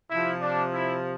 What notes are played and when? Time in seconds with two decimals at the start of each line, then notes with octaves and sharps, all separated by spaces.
0.11 C3 E4
0.16 F3
0.42 D4
0.74 E4